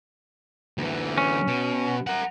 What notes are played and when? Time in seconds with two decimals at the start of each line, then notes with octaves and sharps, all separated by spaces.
0.78 D2 E3
1.18 C#4
1.47 B2
2.07 A#4 F#5